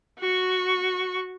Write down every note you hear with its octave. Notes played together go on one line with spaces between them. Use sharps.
F#4 C#6